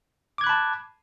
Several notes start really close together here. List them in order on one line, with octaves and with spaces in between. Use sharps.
D6 G#6 F#6 B5 A5